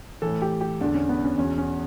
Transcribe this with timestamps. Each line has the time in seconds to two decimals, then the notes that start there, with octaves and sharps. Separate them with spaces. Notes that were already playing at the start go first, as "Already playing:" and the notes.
0.22 A2 E3 A4
0.42 G4
0.61 G4
0.81 E2 D3 D4
0.94 C#4
1.09 B3
1.24 C#4
1.38 E2 B2 C#4
1.58 C#4